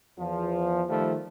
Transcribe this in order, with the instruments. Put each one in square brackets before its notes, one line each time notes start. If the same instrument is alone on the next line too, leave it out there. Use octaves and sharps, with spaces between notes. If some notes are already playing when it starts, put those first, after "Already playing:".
[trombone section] E2 F3
D#3 F3 G3 A3